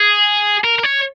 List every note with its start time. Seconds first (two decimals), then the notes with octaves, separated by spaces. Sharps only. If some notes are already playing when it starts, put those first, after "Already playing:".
Already playing: G#4
0.64 A#4
0.78 A#4
0.83 C#5